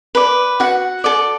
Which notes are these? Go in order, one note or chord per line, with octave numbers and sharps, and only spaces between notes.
B4 D5
F#4 F#5
A4 D5